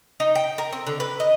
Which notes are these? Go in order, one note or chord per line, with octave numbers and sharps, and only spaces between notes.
D#4
G5
A#4
C4
D3
B4
D#5